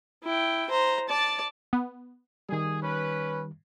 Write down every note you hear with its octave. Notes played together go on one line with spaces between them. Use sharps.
E4 G5
C5 A#5
D5 A5
B3
D#3 G3 G#4
C#4 B4